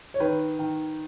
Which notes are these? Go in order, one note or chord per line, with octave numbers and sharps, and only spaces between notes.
C#5
D#3 B4
D#3